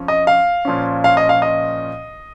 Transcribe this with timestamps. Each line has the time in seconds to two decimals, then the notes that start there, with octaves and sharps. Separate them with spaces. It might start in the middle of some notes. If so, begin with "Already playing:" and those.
Already playing: F2 F3 C#4
0.08 D#5
0.27 F5
0.65 A#2 F3 C#4
1.04 F5
1.17 D#5
1.29 F5
1.42 D#5